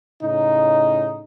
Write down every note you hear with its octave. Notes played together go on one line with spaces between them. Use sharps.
A2 C#3 D#4